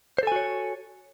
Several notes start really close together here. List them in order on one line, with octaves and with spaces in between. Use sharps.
C5 A4 G#5 F#4 C#5